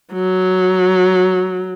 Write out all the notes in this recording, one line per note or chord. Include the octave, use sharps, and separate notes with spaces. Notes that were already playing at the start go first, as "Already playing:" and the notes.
F#3